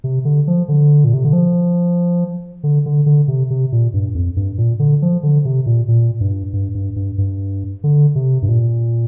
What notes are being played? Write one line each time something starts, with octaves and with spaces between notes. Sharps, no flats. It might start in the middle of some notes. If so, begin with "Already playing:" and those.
C3
D3
F3
D3
A#2
C3
D3
F3
D3
D3
D3
C3
C3
A#2
G2
F2
G2
A#2
D3
F3
D3
C3
A#2
A#2
G2
G2
G2
G2
G2
D3
C3
G2
A#2